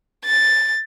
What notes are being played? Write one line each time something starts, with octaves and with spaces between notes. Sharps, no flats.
A6